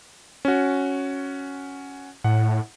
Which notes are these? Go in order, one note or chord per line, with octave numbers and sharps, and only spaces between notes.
C#4 F#4
A2 F#5